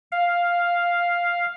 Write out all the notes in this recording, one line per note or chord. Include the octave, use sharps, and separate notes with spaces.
F5